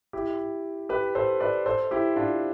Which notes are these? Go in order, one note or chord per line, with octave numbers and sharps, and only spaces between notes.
E4 G4
G4 B4
A4 C5
B4 D5
A4 C5
E4 G4
D4 F4